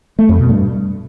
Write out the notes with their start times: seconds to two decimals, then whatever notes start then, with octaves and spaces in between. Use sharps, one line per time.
0.19 A3
0.29 F2
0.39 B2
0.50 G2